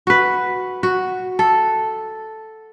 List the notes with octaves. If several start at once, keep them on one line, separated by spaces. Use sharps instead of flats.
F#4 B4
F#4
A4